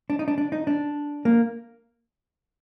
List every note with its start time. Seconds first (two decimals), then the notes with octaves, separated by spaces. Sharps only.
0.10 D4
0.19 D#4
0.28 D4
0.38 D4
0.52 D#4
0.67 D4
1.25 A#3